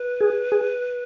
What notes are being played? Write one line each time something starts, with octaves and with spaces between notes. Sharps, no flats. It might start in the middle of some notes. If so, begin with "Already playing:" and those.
Already playing: B4
G#4
G#4